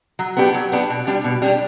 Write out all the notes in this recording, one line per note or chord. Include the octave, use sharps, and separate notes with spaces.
F#3
B3 D4 G4
F#3
B3 D4 G4
B2
G3 D4 G4
B2
G3 D4 G4